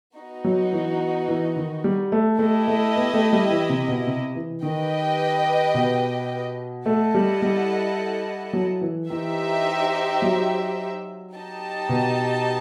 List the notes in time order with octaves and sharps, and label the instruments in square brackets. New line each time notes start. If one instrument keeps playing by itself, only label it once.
[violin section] B3 D#4 F#4
[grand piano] F#3
E3
E3
D#3
G3
A3
[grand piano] A3 [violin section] E4 G4 D#5
[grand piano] A3
B3
A3
G3
E3
C3
B2
C3
E3
[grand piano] D#3 [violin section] G4 B4 D#5 G5
[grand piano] B2
[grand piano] A3 [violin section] E4 A4 D#5 F#5 A5
[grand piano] G3
G3
F#3
E3
[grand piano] E3 [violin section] D#4 G4 C5 E5
[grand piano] F#3
[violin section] D#4 G4 D#5 A5
[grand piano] B2